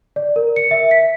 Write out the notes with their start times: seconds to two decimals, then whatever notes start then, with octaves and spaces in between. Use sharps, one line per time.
0.16 D5
0.36 A#4
0.56 C#7
0.71 E5
0.91 B6